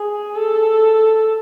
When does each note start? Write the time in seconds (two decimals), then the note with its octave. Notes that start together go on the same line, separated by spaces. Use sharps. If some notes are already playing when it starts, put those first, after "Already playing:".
Already playing: G#4
0.35 A4